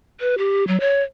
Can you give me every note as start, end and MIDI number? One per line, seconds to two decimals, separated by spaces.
0.21 0.36 71
0.38 0.66 67
0.67 0.79 54
0.80 1.02 73